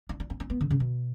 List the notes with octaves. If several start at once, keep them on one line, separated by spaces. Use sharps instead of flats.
D4
D4
C#4
C#4
B3
D3
C#3
B2